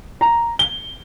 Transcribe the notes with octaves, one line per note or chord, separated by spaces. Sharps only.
A#5
G7